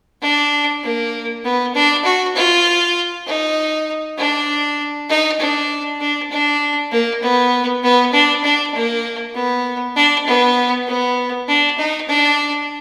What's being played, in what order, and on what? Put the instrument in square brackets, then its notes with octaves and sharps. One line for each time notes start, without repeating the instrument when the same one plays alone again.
[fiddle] D4
A#3
B3
D4
F#4
F4
D#4
D4
D#4
D4
D4
D4
A#3
B3
B3
D4
D4
A#3
B3
D4
B3
B3
D4
D#4
D4